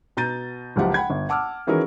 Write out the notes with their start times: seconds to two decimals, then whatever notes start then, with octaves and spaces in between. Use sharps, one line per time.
0.17 B2 A#5 G6 A6 D#7
0.76 F#1 C#2 F#2 F3 G4 F#5
0.94 F#5 G5 B5 G#6
1.10 G1
1.29 F#5 A5 D6 E6 F6
1.67 D#3 E3 C#4 F#4 G#4 A#4